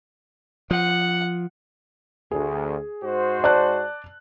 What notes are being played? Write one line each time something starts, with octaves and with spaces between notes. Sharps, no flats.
F3 F#5
D2 G#4
G#2 F#4 C5
D5 A5 F#6